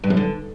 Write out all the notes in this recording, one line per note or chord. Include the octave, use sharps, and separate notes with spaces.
G2
F#2
D3